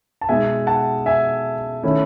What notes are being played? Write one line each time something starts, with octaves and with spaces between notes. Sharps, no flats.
A5
B2 G#3 D#4 E5 G#5
F#5 A5
E5 G#5
D#3 A3 C#4 E4